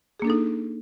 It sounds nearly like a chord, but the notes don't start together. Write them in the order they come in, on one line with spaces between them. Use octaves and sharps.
G#4 A#3 D4 A4 D#4